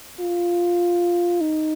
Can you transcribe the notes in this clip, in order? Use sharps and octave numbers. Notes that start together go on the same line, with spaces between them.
F4
D#4